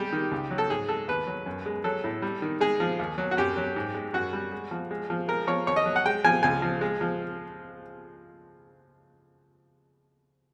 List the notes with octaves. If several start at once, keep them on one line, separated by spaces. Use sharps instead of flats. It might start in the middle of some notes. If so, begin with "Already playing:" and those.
Already playing: G3 G#3 G4
D#3
C#2
F#3
A4
G#2 G#4
G#3 A4
D#2 B4
F#3
F#2
G#3
F#3 A4
A2
G3
D#3
G#3 G#4
F3
D#2
F#3
F#4
F#2 G4
F#3
G#2
G#3
F#2 F#4
G3
G#3
F3
G#3
F3
G#3 A#4
F3 C#5
D#2 C#5
D#5
F#3
F#5
G#3 G5
F3 G#5
C#2 G#5
F3
G#3
F3